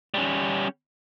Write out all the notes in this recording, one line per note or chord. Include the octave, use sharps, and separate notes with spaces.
G3 C#4